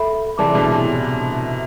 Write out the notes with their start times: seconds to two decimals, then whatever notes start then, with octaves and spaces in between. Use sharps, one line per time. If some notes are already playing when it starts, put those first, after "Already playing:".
Already playing: A4 E5 B5
0.38 C3 E3 E4 G#4 D5 A5 D6
0.55 B2 D3
0.72 A2 C3